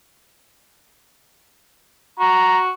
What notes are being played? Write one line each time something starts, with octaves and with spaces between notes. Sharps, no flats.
F#4 A#5